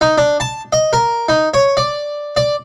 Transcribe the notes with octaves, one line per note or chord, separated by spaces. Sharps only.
D#4
D4
A5
D#5
A#4
D#4
C#5
D5
D5